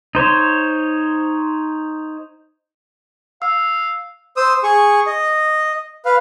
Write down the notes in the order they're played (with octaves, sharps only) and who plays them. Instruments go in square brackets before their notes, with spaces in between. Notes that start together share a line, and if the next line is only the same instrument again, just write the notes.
[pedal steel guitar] D#4 C5 C#5
[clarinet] F5 [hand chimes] E6
[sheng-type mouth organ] C5 D#6 E6
G#4 C#6
D#5
B4 F5